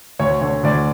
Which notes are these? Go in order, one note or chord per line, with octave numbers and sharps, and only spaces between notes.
D2 C#5
D3 C#5
D2 D5